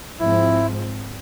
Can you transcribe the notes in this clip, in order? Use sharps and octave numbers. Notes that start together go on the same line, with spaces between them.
G#2 F3 G#3 C4 E4